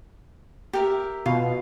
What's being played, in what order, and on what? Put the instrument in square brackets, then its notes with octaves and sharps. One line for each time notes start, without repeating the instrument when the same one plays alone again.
[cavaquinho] G4 A#4 E5
[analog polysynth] B2 [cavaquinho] F4